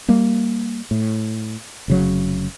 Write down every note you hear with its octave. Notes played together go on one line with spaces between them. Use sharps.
G3 A#3
A2
F1 C#3 F#3